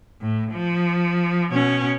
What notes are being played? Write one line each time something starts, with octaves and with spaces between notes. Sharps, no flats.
A2
F3
B2 C#4